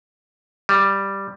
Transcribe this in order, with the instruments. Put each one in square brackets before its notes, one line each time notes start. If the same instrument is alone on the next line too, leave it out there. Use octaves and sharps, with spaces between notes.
[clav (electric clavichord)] G3